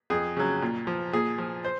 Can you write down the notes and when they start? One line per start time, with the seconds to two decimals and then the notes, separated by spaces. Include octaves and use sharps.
0.10 F2 G#4
0.37 C#3 F#3
0.62 A#2
0.87 F3
1.13 A#2 G#4
1.38 F3
1.65 C5